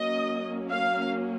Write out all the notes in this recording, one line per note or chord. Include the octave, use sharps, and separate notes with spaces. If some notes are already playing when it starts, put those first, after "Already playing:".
Already playing: F#3 A#3 C#4 D#5
F5